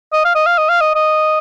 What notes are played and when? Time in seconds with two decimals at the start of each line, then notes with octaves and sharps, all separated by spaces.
0.13 D#5
0.24 F5
0.35 D#5
0.46 F5
0.58 D#5
0.69 F5
0.81 D#5
0.95 D#5